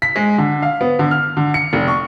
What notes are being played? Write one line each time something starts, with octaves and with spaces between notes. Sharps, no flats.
B6
G#3
D3
F5
B3
D3
F6
D3
C#7
F1
C#6